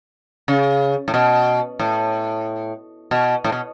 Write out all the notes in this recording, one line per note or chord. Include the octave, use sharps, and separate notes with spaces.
C#3
A2
B2
A2
B2
A2
B2